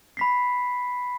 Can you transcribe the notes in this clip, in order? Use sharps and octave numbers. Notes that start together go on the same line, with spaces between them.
B5 B6 C7